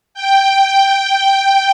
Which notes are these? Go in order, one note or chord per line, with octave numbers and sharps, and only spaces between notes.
G5